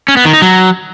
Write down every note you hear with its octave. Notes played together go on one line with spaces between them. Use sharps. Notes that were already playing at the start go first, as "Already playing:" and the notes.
C#4
B3
D#3
D#4
F#3